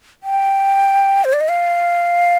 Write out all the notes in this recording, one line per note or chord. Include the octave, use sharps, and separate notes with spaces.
G5
C5
D5
D#5
F5